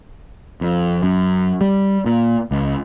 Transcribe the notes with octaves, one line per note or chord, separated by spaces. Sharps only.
F2
F#2
G3
A#2
C#2